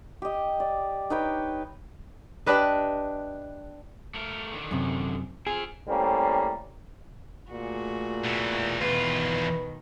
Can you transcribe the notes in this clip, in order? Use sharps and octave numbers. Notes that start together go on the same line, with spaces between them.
G4 D#5
D5
D#4 B4 C#5 G5
D4 G4 B4 D#5
A3 A#4
D3 D#3
F#2 C3
C4 F4 G#4
A2 G3 A#3 C4 C#4
A#2 A3 F#4 G#4
B2 E3
E2 B2 D#3 F4 B4